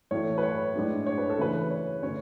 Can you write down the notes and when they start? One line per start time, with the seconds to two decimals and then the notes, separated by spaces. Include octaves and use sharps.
0.11 A2 E3 A3 C#5
0.38 B4
0.43 C#5
0.75 A2 G#3 D4
1.06 C#5
1.18 B4
1.30 A4
1.38 C#3 E3 A3 C#4 B4
1.71 C#5
2.03 D3 A3 C#4 C#5